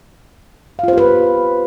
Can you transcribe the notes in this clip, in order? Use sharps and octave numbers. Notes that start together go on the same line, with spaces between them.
F4 G4 B4 C5 F5